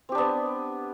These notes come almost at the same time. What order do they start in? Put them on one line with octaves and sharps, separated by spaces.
C4 G4 D4 B3